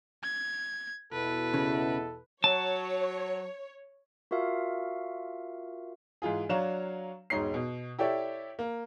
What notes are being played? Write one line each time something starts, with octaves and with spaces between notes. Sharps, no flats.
G#6
E2 B2 E4 A4 B4
C#3
F#3 C#5 A5
F4 F#4 A#4 E5 F5
G#2 E3 F4 G#4
F#3 D4 C#5 F5 A#5 E7
E1 G#2 D#4 C#5 C7
B2
E4 G4 A4 C#5 D5 E5
A#3